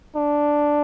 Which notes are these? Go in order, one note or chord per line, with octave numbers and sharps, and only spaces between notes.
D4